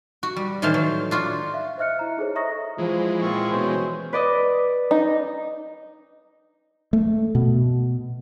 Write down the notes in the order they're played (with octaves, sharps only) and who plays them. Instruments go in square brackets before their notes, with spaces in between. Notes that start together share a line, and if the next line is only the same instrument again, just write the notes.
[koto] F#4
G3
A2 D#3 E3 C5 F5 A5
F#3
D4 F4 F#4
[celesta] E5 F5
C5 D#5 E5 F6 F#6 C#7
E4 A#5
D#4 G#4 A4 C5 C#5
D#5 E5 A#5 C#6 D#6 A#6
[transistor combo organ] E3 G#3 [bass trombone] F3
[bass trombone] A#2 [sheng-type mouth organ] C4 F4 C#6
[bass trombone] B2 [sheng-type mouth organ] C#4 C5
[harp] B4 D5 D#5
[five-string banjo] D#4
[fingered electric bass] A3
B2